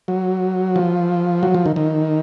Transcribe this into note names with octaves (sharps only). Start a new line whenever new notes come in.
F#3
F3
F#3
F3
D#3
D#3